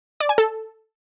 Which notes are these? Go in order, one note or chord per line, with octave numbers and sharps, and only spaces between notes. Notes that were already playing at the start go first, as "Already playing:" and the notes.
D5
G#5
A4